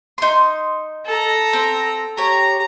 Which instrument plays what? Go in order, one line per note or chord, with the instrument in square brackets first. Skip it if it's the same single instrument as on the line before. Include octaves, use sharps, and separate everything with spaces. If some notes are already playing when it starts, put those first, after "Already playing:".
[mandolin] D#4 C6
[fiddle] A4 A#5
[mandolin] C4
[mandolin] G4 C#5 [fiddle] A#5